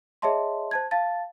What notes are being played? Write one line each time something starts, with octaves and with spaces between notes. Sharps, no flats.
G#4 C#5 D#5 E5 A5 C6
C5 A5 G#6
F5 A5 A6